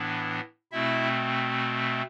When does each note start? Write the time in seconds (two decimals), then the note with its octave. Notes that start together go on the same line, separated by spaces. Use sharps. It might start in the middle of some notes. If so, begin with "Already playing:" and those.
Already playing: A2 E3 B3 D4
0.72 B2 A3 C4 E4 E5